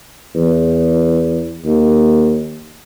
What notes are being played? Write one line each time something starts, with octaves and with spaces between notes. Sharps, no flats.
E2
D#2